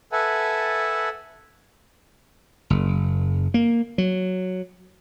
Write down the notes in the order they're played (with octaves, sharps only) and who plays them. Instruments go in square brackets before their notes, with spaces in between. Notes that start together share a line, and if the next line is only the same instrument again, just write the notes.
[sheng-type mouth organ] A4 B4 E5 F#5 G#5 A5
[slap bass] F#1
A#3
F#3